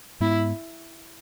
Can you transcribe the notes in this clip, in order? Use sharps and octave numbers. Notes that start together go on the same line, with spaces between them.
G#2 G#3 B3 E4